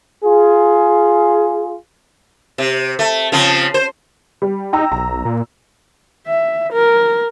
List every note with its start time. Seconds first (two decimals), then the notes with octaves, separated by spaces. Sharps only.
0.24 F4 G#4
2.58 C3
2.99 A3
3.32 C#3 F3 C4
3.74 C5
4.42 G3
4.73 D#4 G5 A#5 E6
4.92 B1 A#5
5.25 A#2
6.27 E5
6.72 A#4